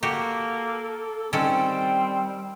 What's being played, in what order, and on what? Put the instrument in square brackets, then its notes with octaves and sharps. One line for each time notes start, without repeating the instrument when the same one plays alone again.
[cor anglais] A#3 [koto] F#4 G4 [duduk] A4
[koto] D#3 C#4 A4 [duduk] G3 [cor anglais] C4 [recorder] G5